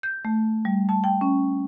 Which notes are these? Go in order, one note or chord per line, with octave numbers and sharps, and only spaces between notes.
G6
A3
G3
A5
G5
C#4